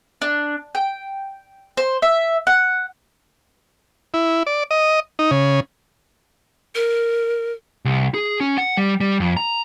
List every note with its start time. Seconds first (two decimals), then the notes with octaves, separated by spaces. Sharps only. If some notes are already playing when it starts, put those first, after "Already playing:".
0.22 D4
0.75 G5
1.77 C5
2.02 E5
2.47 F#5
4.14 E4
4.47 D5
4.71 D#5
5.19 D#4
5.31 C#3
6.75 A#4
7.85 C2
8.14 G#4
8.41 C#4
8.58 F#5
8.77 G3
9.00 G3
9.20 F2
9.37 A#5